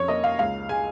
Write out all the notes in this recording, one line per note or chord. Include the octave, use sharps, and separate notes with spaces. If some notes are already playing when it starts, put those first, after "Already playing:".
Already playing: F2 C#4 C#5
A#3 D#5
F5
C#2 F5
G#3 G#5